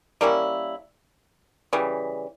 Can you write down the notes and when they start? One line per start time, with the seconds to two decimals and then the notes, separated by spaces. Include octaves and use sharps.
0.21 G3 A#3 C#4 E4
1.73 C#3 E3 G3